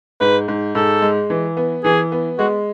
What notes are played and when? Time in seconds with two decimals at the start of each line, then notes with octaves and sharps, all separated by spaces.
0.21 G#2 B4
0.48 G#2
0.75 G#2 A4
1.02 G#3
1.30 E3
1.57 B3
1.84 E3 G#4
2.12 B3
2.39 G#3 F#4